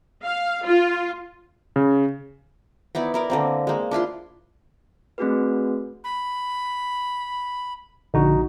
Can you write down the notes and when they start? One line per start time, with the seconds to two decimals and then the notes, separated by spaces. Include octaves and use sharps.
0.25 F5
0.66 F4
1.76 C#3
2.95 B3 D#4 E4 D5
3.14 E4 A#4 D5
3.30 D3 A#3 C4
3.67 G#3 A#3
3.91 D4 E4 F4 C6
5.18 A3 C4 D4 F#4 G#4 B4
6.04 B5
8.14 A#1 D3 D#4 F#4